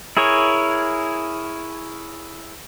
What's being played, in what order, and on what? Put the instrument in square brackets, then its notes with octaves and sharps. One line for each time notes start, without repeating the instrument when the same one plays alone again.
[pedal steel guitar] E4 G#4 A#4 C#5